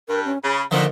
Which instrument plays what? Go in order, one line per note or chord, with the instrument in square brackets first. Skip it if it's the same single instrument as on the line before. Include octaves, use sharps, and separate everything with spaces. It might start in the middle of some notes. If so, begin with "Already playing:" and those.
[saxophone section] G2 [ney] A#4
[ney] C#4
[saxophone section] C#3 [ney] B5
[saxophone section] A#2 [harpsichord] D3 D#3 F3 [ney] D#5